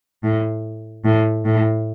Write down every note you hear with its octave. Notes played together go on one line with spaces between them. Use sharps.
A2
A2
A2